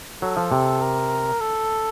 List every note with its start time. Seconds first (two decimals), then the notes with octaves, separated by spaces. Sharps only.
0.22 F#3 A4
0.37 F3
0.52 C3
0.81 A#4
1.40 A4